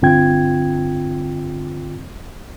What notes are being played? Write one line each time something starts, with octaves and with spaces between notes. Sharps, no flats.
G2 D3 C4 F4 G5 G#6